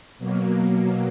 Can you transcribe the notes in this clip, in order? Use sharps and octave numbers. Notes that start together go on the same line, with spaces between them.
B2 F#3 A#3